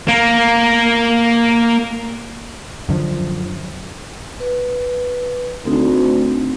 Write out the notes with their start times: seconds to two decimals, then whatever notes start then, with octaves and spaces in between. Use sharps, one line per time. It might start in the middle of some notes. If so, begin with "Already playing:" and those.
0.08 A#3 A#4
2.89 F#2 D3 D#3 F3
4.40 B4
5.66 D2 C4 D#4